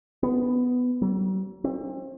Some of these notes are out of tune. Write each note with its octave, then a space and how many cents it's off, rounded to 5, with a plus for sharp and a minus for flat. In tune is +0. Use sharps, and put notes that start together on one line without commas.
B3 +10
F#3 +45
C4 +30